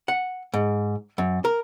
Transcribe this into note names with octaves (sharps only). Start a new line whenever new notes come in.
F#5
G#2
F#2
A#4